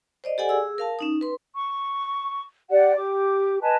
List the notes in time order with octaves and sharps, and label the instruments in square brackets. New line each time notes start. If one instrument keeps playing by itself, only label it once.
[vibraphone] C5 D5 D#5
G4 A4 D5 F#5 G#5
G#4 E6
A#4 F5 A5
C#4 D#4 D#6
B4 C6
[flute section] C#6
G4 D5 F#5
G4 D6
B4 D#5 G#5 A5